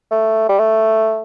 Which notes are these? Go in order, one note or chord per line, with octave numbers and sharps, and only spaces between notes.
A3
G3
A3